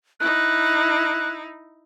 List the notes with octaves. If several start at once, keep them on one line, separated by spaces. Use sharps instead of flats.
D#4 E4 F#6